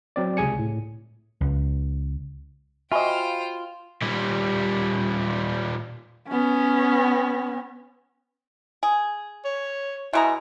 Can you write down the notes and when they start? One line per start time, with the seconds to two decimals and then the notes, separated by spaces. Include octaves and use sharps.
0.16 F#3 C4 D5
0.37 C#2 C3 G#4 G#5 C#7
0.59 A2
1.41 C#2
2.92 F4 F#4 C5 D#5 E5 G5 G#5 B5
4.03 A#2 G3
6.28 B3 C#4
8.83 G#4
9.45 C#5
10.13 B2 G#3 E4 A#5